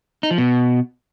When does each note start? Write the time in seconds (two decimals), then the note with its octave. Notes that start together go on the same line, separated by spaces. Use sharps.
0.23 D#4
0.31 F3
0.38 B2